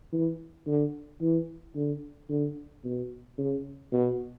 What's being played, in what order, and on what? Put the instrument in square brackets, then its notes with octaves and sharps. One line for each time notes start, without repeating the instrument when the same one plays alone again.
[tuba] E3
D3
E3
D3
D3
B2
C#3
B2